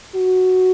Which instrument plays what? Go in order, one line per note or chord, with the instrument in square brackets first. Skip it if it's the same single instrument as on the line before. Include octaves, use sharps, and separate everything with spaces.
[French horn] F#4